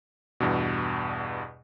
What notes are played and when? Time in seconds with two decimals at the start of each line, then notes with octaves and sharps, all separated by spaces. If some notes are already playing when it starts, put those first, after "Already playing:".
0.40 E2 G2 B2